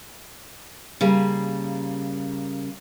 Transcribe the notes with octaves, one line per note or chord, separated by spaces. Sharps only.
C#3 G3 A#3